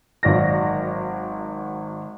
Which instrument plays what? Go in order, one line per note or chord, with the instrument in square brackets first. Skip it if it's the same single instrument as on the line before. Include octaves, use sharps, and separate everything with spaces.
[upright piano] G#1 F#3 D5 F5 A#6